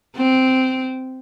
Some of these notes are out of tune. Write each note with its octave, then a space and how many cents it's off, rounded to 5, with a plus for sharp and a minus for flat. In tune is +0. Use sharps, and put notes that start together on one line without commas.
C4 -10